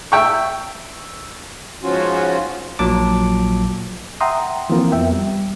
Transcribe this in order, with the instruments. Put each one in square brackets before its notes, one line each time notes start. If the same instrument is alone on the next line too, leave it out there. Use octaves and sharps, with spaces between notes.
[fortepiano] E5 G5 C#6
[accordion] G#2 C#3 F3 C#4 F4 F#4
[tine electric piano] A#1 A#2 F#3 A5 D6
[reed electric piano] E5 F#5 G5 A#5 C6 D#6
E3 F3 A#3 C4 F4 A#4
F2 B3 E5 G5
G3